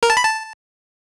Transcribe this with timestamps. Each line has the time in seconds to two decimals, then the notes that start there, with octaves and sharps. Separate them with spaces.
0.03 A#4
0.10 A5
0.17 B5
0.24 A5